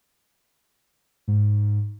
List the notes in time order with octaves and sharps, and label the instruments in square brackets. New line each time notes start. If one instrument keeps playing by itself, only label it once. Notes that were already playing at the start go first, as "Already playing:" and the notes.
[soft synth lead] G#2